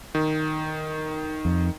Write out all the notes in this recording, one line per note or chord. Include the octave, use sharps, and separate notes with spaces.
D#3
F2